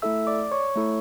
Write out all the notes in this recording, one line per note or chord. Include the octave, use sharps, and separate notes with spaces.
A3 E4 A4 E5 E6
D5 D6
C#5 C#6
A3 E4 A4